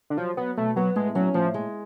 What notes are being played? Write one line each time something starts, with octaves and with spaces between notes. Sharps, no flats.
D3
F3 F#3
F#3 B3
B2 A3
F#3 B3
A2 G#3
F#3 C#4
A2 F3
G#3